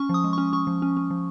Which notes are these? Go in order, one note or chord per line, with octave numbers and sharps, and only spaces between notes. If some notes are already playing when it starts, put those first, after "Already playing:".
Already playing: C#4 C#6
F3 D#6
G#3
C#4 C#6
C#4 C#6
F3
C#4
C#4
F3